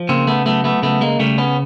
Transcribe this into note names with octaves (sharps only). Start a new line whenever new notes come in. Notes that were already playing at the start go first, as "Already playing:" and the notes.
Already playing: F3
C#3 A#3 C4
A3 B3
F#3 A3 B3
A3 B3
C#3 A3 B3
G#3 A#3
C#3 G3 A3
B3 C#4